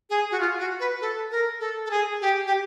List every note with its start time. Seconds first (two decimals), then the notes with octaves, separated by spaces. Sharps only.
0.10 G#4
0.31 F#4
0.40 F4
0.59 F#4
0.80 B4
1.01 A4
1.31 A#4
1.60 A4
1.86 A4
1.91 G#4
2.21 G4
2.47 G4